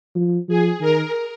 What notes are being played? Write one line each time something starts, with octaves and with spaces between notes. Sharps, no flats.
F3
F3 G#4
D#3 A#4